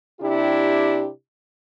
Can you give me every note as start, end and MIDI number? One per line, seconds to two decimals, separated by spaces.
0.21 1.08 48
0.21 1.08 62
0.21 1.08 64
0.21 1.08 67